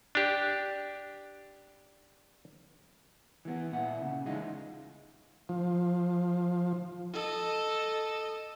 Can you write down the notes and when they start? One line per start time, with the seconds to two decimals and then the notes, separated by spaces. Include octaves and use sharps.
0.15 D4 G4
3.45 E3 B3
3.72 A#2 E4 F#5
4.02 C#3
4.26 E3 G#3 D#4 F4
5.49 F3
7.13 A4 D#5